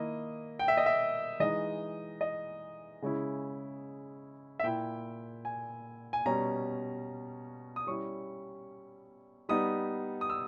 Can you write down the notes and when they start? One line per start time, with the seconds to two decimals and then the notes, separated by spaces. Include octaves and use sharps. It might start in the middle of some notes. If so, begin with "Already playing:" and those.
Already playing: D#3 A#3 E4 D#5
0.59 G5
0.68 E5
0.77 D#5
0.86 E5
1.40 E3 G#3 D#4 D#5
2.21 D#5
3.02 C#3 G#3 C#4 E4
4.59 E5
4.63 A#2 A#3 E4 G5
5.45 G#5
6.13 G#5
6.26 B2 G3 C#4 A#5
7.76 D#6
7.87 G3 C#4 E4 C#6
9.49 G3 B3 D#4 D#6
10.21 D#6
10.30 E6